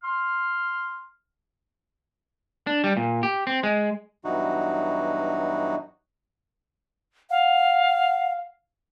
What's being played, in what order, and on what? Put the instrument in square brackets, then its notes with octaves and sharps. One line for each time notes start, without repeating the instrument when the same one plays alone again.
[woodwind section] C6 F6
[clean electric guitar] D4
G3
A#2
G4
C4
G#3
[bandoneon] G2 B2 E3 F#3 D#4 F#4
[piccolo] F5 [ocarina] F#5